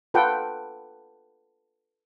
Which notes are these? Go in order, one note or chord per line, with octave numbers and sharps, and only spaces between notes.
F4 A4 B4 F#5 G5